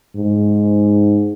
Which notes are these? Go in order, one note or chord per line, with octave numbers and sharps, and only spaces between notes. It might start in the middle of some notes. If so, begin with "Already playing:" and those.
G#2